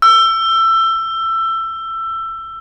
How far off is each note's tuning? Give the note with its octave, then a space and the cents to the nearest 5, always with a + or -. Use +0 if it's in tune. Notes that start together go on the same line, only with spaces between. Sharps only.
E6 +20